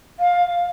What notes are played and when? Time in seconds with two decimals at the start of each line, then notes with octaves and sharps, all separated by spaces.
0.19 F5